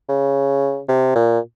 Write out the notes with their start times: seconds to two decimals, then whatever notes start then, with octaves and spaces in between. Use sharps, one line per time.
0.09 C#3
0.89 C3
1.15 A#2